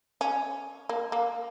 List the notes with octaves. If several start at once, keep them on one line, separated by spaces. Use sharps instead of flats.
C#4
A#3
A#3